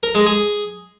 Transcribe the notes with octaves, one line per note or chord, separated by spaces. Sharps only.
A#4
G#3
G#4